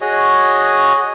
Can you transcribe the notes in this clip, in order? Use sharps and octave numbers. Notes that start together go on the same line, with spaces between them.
F#4 G#4 C#5 D#5